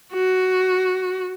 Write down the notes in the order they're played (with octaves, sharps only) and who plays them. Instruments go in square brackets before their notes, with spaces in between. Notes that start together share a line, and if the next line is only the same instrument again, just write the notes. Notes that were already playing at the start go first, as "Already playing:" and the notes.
[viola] F#4